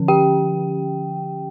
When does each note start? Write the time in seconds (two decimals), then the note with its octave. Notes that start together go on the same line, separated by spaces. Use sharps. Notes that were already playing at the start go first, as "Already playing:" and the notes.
Already playing: D3 F3 C#4
0.08 G4 G5